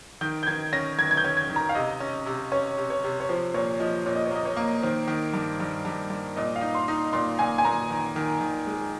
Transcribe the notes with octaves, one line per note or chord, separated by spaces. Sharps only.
D#3 G6
G6
D#3 G#6
C#4 A#6
D#3 G#6
G#6
G6
C#4
G#6
D#3
A#5
F5
C3 D#5
C#4
C3
C#4 C#5
C3
C#5
C3
C#5
F3 C5
A#2 C#5
F3 D#5
A#2 C#5
D#5
C#5
A#3 D#5
C#5
A#3
D#3 C5
D#3
G2
G2
G2
G2
A#2 D#5
F5
D#4
C6
D#4
A#2 C6
A#2 G#5
G#5
A#2 A#5
D#3
D#3
D#3
G#3